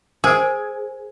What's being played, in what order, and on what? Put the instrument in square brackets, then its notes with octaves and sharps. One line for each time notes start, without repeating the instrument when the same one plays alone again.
[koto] G#4 [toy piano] A#4 C5 G#5